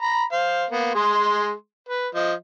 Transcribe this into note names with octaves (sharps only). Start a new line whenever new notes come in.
A#5 B5
C5 F5
A#3 B3
G#3 G#4 C6
B4
F3 D#5